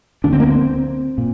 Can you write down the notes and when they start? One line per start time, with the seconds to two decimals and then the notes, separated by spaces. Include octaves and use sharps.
0.24 D2 D3 D4
0.33 C4
0.40 A#3
0.48 C4
1.18 A#2